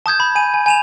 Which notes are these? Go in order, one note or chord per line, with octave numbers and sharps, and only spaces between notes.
A5 D#6 G6 G#6
B5
G#5 D#7
G#5
G#5 E7 F7